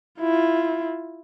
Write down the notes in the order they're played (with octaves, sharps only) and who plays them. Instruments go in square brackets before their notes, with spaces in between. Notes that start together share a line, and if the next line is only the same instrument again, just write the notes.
[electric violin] E4 F4